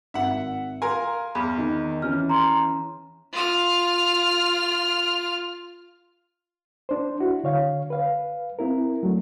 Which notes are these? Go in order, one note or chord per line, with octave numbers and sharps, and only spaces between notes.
G#1 E5 F#5
A#4 F5 G#5 C6
E2 B5 F6
D#3
E3 C#4 F6
A#5 C6
F4 F6
D4 C5
E4 F#4
D3 C#5 F5
B4 F5
C4 E4 A#4
F#3 A3